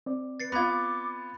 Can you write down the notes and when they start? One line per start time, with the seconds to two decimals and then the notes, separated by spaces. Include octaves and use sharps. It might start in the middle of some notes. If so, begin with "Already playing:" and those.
0.06 C4 D5
0.40 B4 A6 C7 C#7
0.52 B3 F4 B5 D6 G#6